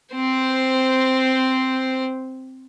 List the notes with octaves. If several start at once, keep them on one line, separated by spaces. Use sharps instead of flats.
C4 C5